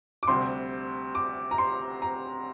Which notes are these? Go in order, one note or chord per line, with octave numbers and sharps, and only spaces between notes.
D6
D2 C3 G3 C6
D6
A#5
C6
A#5